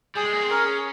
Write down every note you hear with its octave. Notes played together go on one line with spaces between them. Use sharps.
G3 G#4
G#3
A#3
C4
C#4 A#4
G#4